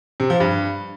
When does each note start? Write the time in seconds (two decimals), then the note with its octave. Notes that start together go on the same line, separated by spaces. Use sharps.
0.20 C3
0.30 F3
0.40 G2